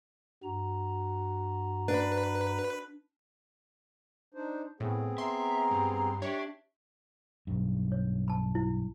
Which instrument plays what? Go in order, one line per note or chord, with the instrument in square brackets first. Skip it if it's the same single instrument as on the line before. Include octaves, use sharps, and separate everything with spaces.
[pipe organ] G2 A#5 [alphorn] F#4
[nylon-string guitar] D4 [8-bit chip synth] B4
[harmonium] D4 D#4 C5
[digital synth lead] A2 [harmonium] B3 C4 G#4
[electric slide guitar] E5 [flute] A#5 [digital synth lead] C6
[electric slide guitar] G2
[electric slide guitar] D4 [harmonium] G4 [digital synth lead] C#5 [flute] E5
[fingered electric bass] B1 G2
[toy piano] C#5
A5 B5
E4